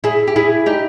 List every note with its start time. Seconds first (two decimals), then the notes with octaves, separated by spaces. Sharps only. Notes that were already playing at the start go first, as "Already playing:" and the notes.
0.04 E4 G#4
0.27 G4
0.36 E4 G#4
0.66 D#4 G4